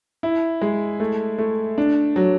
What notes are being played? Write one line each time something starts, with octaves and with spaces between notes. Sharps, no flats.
E4
G#3
A3
A3
D4
F#3